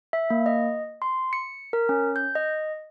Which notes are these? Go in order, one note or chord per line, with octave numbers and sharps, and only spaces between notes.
E5
A#3
D#5
C6
C#7
A#4
C#4
G6
D#5